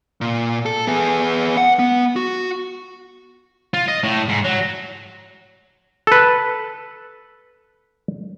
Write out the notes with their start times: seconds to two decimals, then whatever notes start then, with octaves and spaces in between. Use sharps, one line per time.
0.21 A#2
0.66 A4
0.87 B3 G#4
1.57 F#5
1.79 B3
2.16 F#4
3.74 F4
3.88 D#5
4.04 A2
4.29 G#2
4.45 F#3
6.07 A4 B4